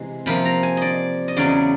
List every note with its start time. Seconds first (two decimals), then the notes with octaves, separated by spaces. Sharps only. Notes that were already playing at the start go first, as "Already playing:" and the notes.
Already playing: C3 E3 G#3
0.26 C3 F3 A#3 B5
0.45 A#5
0.63 G#5
0.77 D5 D#5
1.28 D#5
1.37 E2 C#3 F#3 D5